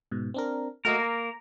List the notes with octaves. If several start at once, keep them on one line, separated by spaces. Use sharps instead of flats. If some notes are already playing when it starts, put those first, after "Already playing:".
G#2 B2
C4 D4 A#4
A3 A#3 F#4 A#4 D#5
A#5